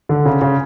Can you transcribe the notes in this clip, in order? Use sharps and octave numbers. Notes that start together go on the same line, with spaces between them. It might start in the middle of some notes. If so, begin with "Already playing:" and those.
D3
C#3
C#3